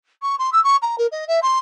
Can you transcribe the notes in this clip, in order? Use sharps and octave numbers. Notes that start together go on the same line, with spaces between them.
C#6
C6
E6
C#6
A#5
A#4
D#5
E5
C6